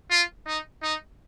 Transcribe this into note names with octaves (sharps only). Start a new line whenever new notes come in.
F4
D#4
D#4